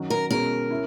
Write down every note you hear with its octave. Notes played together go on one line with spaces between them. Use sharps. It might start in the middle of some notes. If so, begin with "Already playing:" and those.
Already playing: D#3 F#3 C#4 F#4
A#4
B2 G#3 C#4 A#4
C#4 E4